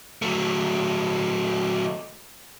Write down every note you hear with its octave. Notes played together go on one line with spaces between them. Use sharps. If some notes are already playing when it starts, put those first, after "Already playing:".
F#3 A3